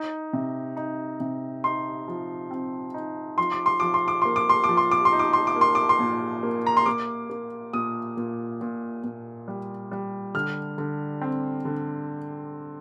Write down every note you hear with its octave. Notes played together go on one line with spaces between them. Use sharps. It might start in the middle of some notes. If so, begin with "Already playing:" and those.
Already playing: D#4
C3
D#4
C3
D#4 C6
F3
C4
D#4
F3 C6
D6
C6
F3 D6
C6
D6
A#3 C6
D6
C6
D6
F3
C6
D6
C6
D#4
D6
C6
D6
A#3
C6
D6
C6
A#2
A#3
A#5
C6
A#3 D6
A#3
A#2 D#6
A#2
A#2
A#2
G3
G3
D3 F6
D3
C4
D3